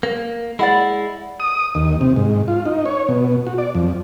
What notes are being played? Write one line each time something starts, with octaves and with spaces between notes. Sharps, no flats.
A#3
G#3 E4 D5 F#5 B5
D#6
D#2
C3
G#2
F4
D#4
C#5
B2
F#4
D5
F2